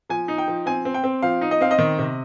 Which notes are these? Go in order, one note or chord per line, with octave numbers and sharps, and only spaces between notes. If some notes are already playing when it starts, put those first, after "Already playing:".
F3 G#5
D#4
G5
F3
C4 G#5
C4
G5
C4
F3 F5
D#4
D#5
C4 F5
D#5
D#3
C3